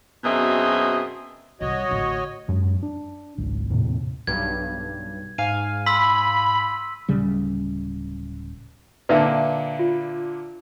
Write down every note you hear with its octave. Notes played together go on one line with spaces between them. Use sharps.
F#2 B2 C4 G#4 D#5 E5
C2 F#4 C#5 D#5
A1 D2
F#2 G#3
D4
G#1 C#2
D#2 A2 C3
B1 G2 G#6
G#2 F5 G#5 D#7
B5 C6 E6 B6
D1 C#3 G3
A#2 D3 B4 E5 A5
F4